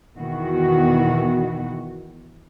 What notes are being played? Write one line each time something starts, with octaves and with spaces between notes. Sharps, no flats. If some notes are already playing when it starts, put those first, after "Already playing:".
E2 B2 D#3 E3 F#4